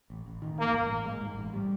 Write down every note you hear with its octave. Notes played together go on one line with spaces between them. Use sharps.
A1
A1
D#3
A1 A#3
G#2
A1
G#3
G#2
A1
G3